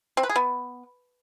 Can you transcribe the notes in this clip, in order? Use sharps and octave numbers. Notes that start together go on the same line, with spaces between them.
C4
B4
G#4
B3